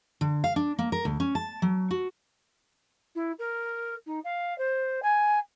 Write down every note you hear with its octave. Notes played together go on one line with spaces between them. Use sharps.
D3
F5
D4
A#3
A#4
D2
C#4
A5
F#3
F#4
E4
A#4
D#4
F5
C5
G#5